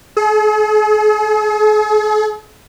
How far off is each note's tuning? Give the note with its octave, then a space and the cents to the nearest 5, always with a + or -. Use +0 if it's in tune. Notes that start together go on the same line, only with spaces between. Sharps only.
G#4 +45